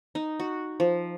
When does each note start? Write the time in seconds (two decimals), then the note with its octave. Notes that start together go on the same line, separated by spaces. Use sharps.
0.15 D#4
0.40 F#4
0.80 F3